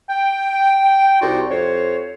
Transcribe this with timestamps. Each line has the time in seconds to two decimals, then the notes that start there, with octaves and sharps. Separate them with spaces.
0.09 G5
1.21 C2 D#4 F#4 D5 C6
1.49 F2 C5 C#5